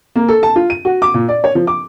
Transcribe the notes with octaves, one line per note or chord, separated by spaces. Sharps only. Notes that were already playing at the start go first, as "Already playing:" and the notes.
A#3
A4
A5
F4
D#7
F#4
D6
A#2
D5
C#5
F3
D6